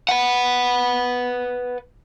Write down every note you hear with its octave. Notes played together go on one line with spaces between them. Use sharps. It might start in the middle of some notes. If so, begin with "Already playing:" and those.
B4 F#5